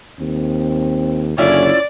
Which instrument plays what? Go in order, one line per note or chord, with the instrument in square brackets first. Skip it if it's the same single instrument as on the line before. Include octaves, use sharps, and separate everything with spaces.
[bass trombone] D#2 [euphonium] C4
[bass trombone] F#1 [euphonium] D3 [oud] C#4 E4 F4 [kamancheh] D5